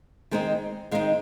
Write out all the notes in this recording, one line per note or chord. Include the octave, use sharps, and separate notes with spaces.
D#3 G#3 C4 D#4
D#3 G#3 C4 D#4 F5